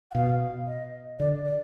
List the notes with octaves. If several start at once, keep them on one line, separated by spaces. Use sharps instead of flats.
F#5
B2 F5
D#5
D3 D5
D5